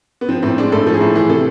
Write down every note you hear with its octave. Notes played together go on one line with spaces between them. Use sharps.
B3
F3 C4
A2 C4
G#3 D4
A2 A4
F3
G#4
A2
E3 G#4
C3 A4